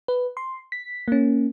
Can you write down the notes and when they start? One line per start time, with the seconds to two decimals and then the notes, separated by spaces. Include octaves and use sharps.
0.08 B4
0.37 C6
0.72 B6
1.08 A#3 C#4